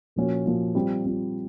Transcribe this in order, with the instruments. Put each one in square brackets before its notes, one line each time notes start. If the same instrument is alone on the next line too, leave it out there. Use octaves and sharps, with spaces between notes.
[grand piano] A#2 F3 A#3 C#4 F#4
A#2 F3 A#3 C#4 F#4
G3 C4 F4
G3 C4 F4